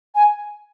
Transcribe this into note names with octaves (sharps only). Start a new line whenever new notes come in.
G#5